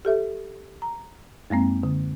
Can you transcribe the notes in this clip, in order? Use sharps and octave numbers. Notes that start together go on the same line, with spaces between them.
G4 A4 E5
A#5
F#2 G#3 A#3 C4
D3